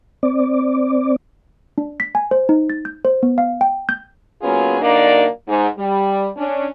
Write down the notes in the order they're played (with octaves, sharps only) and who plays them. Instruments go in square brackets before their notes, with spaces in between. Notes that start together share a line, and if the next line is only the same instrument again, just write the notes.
[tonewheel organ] C4 D5
[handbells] D4
B6
G#5
C5
D#4
A6
G6
C5
B3
F5
G5
G6
[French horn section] F#3 A#3 B3 C#4 F4 G#4
F#2 D3 A#3 D4 D#4 D5
G#2
G3
C#4 D4